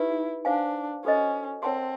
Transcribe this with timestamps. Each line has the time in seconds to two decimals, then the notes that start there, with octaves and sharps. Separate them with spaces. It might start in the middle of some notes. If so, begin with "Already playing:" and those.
Already playing: D#4 E4 G4 B4
0.45 D4 C5 F5 G#5
1.04 C#4 F#4 A4 C5 D#5
1.63 C4 A#4 C#5 F#5 A5 C6